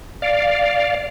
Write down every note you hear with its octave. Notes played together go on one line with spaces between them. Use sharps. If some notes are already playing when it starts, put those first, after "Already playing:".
D5 F5